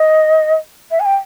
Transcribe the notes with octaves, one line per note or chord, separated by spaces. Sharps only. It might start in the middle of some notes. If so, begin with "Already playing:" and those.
Already playing: D#5
E5
G#5
G5